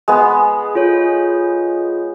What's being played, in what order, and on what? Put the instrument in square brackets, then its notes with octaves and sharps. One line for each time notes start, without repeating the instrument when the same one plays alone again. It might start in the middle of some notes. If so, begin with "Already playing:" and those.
[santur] G#3 B3
[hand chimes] F4 A4 C#5